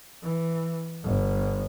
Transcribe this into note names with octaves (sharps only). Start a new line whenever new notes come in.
E3
G1